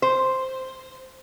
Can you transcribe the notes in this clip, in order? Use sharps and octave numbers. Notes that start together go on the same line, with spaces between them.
C5